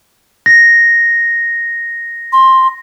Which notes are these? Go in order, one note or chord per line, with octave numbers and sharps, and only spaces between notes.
A#6
C6